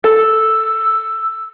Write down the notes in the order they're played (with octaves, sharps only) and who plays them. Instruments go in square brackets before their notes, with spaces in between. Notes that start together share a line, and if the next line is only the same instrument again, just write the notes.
[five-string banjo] A4 [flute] E6